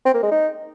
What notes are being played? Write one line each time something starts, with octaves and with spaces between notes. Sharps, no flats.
C4
A#3
G#3
D#4